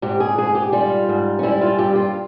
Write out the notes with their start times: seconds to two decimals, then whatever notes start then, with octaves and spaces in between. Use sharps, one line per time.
0.02 G#2 G4
0.20 G#4
0.38 G#2 G#4
0.55 G4
0.72 G3 F4
1.09 G#2
1.39 C#4
1.43 G3 E4
1.61 F4
1.78 G2 G4
1.95 F4